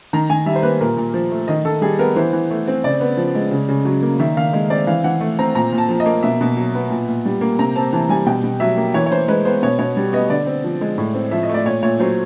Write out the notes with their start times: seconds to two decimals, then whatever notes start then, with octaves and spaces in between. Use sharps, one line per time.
0.13 D#3 A#5
0.29 D#3 G#5
0.46 G3 E5
0.55 C5
0.63 A#3 B4
0.81 A#2 A#4
0.97 A#2
1.14 F3
1.32 A3
1.48 D#3 D#5
1.65 D#3 A4
1.82 G3 G#4
1.99 B3 A#4
2.16 E3 C5
2.33 E3
2.50 A3
2.68 C4
2.84 C#3 D5
3.00 B3
3.17 F3
3.35 G#3
3.51 C#3
3.69 C#3
3.85 F#3
4.02 A#3
4.20 D#3 E5
4.37 D#3 F5
4.53 G#3
4.70 C4 D5
4.87 E3 F5
5.04 E3 F#5
5.21 A3
5.39 C4 A#5
5.55 A#2 A#5
5.72 A#2
5.78 A5
5.89 F3
6.00 D#5
6.06 A#3
6.23 B2 E5
6.41 B2
6.57 F#3
6.74 B3
6.90 A#2
7.08 A#2
7.25 G3
7.41 A#3
7.59 C3 A#5
7.76 C4 A5
7.93 E3 A5
8.09 G3 G#5
8.26 B2 G5
8.44 B2
8.60 F#3 E5
8.77 A#3
8.94 E3 C#5
9.06 C#5
9.11 E3 C5
9.28 G#3 B4
9.45 B3 C5
9.63 B2 C#5
9.79 B2 C#5
9.97 G3
10.13 B3 D#5
10.30 D3 D5
10.46 C4
10.64 F3
10.81 G#3
10.98 A2
11.14 C4
11.31 F3 E5
11.43 D#5
11.49 A3 D5
11.65 A#2 C#5
11.83 A#2 C#5
12.00 F#3 C5